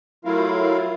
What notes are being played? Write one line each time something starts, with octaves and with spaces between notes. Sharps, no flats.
F#3 A3 E4 F4 A#4 F5